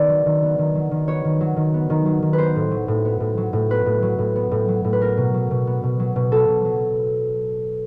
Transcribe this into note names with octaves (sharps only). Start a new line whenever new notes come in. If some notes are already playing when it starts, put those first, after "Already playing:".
Already playing: D#3 B3 D5
F#3
D#3
B3
D#3
F#3
D#3
B3 C#5
D#3
F#3
D#3
B3
D#3
F#3
D#3
B4
B3 C5
A2
F#3
A2
B3
A2
F#3
A2
B3 B4
A2
F#3
A2
B3
A2
F#3
A2
B4
B3 A#4
B2
F#3
B2
B3
B2
F#3
B2
B3 A4
B2
F#3